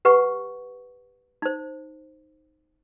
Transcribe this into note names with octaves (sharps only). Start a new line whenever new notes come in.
G4 B4 F#5 C#6
D#4 C5